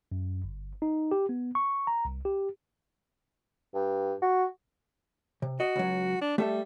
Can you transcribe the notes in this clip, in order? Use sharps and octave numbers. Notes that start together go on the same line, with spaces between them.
F#2
G1
D#4
G4
B3
C#6
A#5
C2
G4
G2
F#4
C3
F#4 D#5
C#2 F#3
D4
G3 A3 A4 E5